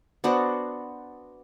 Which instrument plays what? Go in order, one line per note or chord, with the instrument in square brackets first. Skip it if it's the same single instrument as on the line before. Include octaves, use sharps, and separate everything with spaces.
[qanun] B3 D4 F#4 C5